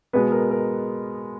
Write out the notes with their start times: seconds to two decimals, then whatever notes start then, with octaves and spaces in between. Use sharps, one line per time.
0.13 B2 G#3 B3 B4
0.32 A#4
0.51 A#4